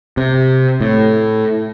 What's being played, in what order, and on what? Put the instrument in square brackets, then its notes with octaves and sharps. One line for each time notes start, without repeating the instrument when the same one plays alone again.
[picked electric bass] C3
A2